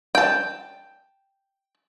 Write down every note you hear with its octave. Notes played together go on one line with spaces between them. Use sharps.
G5 A5